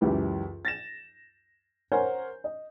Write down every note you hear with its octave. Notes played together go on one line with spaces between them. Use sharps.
C#2 F#2 E3 G4 B4
A6 A#6 E7
A#4 C5 C#5 F#5 G#5
D#5